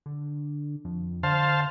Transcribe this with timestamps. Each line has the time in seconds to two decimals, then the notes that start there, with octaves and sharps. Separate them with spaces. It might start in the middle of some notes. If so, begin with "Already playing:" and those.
0.06 D3
0.85 F2
1.23 D3 C5 F5 A5